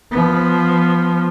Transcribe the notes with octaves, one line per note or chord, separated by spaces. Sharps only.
F3 B3